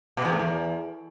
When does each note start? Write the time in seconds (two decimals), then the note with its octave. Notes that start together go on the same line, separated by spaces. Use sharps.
0.17 B2
0.25 E2
0.32 A2
0.39 E2